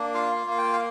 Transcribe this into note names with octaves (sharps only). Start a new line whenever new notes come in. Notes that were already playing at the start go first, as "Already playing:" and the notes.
Already playing: A#3 D4
F4 F5
F5
A#3 F5
G5
F5